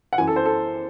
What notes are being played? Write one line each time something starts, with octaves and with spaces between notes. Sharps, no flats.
F#5
F#2 E3 G#5
A4
C5
A4